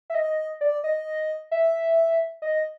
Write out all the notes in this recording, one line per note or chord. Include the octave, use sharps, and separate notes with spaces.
E5
D#5
D5
D#5
E5
D#5